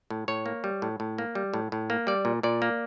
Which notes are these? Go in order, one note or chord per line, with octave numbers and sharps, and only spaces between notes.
A2
A2 C#5
A#3
G3
A2
A2
A#3
G3
A2
A2
A#3
G3 D5
A#2
A#2 D5
A#3